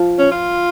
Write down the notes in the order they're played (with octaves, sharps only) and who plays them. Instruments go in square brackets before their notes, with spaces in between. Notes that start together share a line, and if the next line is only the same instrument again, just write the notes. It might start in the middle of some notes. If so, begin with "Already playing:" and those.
Already playing: [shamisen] F3
[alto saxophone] C#4
F4